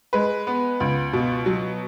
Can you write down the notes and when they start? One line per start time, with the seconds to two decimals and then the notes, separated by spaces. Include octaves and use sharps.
0.13 G#3 B4
0.47 B3
0.80 C#2
1.13 B2
1.46 F#3